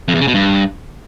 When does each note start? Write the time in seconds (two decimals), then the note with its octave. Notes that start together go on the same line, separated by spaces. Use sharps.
0.08 F2
0.15 E2
0.21 C#3
0.28 B2
0.34 G2